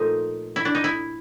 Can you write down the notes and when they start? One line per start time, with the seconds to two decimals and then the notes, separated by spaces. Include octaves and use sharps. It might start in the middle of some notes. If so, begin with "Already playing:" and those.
Already playing: A#2 F3 A3 D#4
0.56 E4
0.65 D4
0.75 D#4
0.84 E4